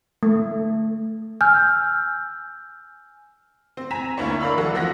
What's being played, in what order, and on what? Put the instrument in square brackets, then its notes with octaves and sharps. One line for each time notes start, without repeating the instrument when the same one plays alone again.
[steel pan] A3
[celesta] G#5 E6 F6 G6
[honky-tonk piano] C4
G#5 A#5 B6 E7
D2 A#3 D4 E4 C#5 C#6
A#4 D5 F5 B5 E6
E3 F#3 A4 F#5
F3 C4 F#4 F#5 A#6 B6